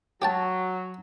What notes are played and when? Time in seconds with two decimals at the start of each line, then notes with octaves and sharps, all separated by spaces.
0.22 F#3 G4 G5 A5